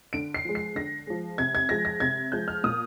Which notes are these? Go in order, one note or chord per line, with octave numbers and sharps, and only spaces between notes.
D3 D7
C7
F3 G#3
C7
D3 A#6
F3 G#3
C3 G#6
G#6
F3 G#3 A#6
A#6
C3 G#6
F3 G#3 G6
F6
A#2 D#6